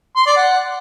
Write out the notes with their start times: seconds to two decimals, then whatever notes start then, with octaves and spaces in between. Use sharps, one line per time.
0.16 C6
0.26 D5
0.36 F#5